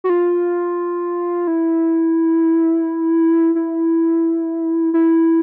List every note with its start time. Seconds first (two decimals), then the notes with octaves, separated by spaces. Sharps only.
0.04 F#4
0.10 F4
1.47 E4
3.55 E4
4.94 E4